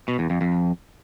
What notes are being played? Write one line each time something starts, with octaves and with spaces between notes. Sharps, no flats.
B2
E2
F2
F2